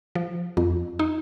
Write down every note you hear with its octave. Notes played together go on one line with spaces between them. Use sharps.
F3
F2
D#4